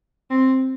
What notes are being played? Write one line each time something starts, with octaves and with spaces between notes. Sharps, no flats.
C4